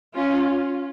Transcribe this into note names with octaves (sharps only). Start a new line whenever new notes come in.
C#4 F4